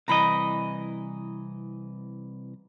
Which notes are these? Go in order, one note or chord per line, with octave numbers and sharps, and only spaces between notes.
C2 E3 D#5 A#5 B5